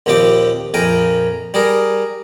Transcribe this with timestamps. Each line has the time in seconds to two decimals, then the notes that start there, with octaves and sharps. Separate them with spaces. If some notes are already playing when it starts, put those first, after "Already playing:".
0.06 A#1 D#2 F3 C4 G4 G5
0.74 A#1 F2 A#4 G5 G#5
1.54 G3 G#4 A#4